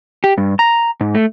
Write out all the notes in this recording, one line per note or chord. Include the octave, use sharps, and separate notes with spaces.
G4
G2
A#5
G#2
A3